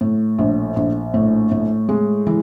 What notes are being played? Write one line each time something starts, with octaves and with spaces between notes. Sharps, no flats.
A2
A#1
A#1
A2
A2
G#3
E3